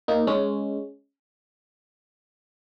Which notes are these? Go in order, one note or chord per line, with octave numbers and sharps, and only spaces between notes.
A#3 D#4
G#3 C#4